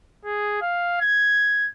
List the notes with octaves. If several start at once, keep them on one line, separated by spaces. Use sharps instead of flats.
G#4
F5
G#6